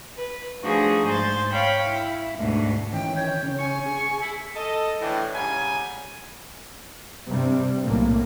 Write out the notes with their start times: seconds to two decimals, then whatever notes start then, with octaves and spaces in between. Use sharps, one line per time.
0.17 B4
0.63 F3 A3 D4 D#4 F#4 G#4
1.07 G#2 C5 A6
1.52 C#5 F5 G5 B5
1.88 E4
2.37 D2 G#2 B2
2.93 D#3 E3 C#4 G5
3.16 C#5 G5
3.43 C#3 C#4
3.59 G#5 C#6
3.86 G#4
4.22 E4
4.55 A4 D#5
5.00 A2 E3 D4
5.34 G#2 C#3 G3 G#5
7.28 G2 C3 G3 C4
7.84 B1 A2 A#3